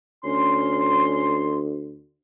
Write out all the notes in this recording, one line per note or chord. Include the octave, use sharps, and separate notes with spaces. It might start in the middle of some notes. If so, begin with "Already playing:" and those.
D2 C#4 C6